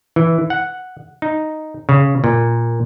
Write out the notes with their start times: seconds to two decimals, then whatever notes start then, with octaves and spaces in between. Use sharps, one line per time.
0.16 E3
0.50 F#5
1.22 D#4
1.89 C#3
2.24 A#2